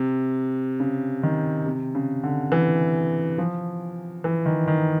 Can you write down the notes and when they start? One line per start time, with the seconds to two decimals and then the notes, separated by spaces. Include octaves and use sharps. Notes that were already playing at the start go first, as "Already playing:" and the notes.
Already playing: C3
0.80 C#3
1.23 D#3
1.66 C3
1.95 C#3
2.23 D3
2.52 E3
3.38 F3
4.24 E3
4.46 D#3
4.68 D#3